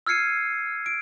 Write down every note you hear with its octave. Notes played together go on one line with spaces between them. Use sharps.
E6 F6 G#6 C7 C#7 D#7
D7